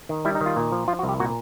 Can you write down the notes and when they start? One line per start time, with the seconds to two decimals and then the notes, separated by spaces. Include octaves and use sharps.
0.09 D#3
0.25 G3 E4
0.35 D#4
0.41 D#3
0.46 F4
0.56 A#2
0.72 F3
0.88 F3 F4
0.99 F#4
1.03 C2
1.09 G4
1.20 A#2 F#4